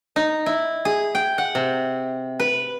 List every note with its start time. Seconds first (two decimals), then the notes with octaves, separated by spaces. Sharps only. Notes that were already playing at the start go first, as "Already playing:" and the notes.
0.16 D#4
0.46 E4
0.85 G#4
1.15 G5
1.38 F#5
1.55 C3
2.40 B4